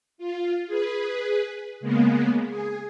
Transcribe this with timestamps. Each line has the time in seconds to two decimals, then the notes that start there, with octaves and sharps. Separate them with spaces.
0.18 F4
0.67 G#4 B4
1.80 C#3 G#3 A#3 B3
2.48 G#4